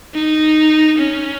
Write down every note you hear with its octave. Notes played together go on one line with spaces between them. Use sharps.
D#4
C#4